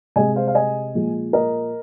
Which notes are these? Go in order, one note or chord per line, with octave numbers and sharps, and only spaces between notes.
C3 G#3 D#5 G#5
C5 F5
F5
D#5 G#5
A#2 F3 G#3
A#4 D#5